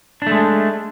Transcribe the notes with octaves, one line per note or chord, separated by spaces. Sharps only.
G#3 A3 D4